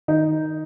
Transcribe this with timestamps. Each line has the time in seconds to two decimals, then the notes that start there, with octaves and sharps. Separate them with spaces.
0.08 D#3 D#4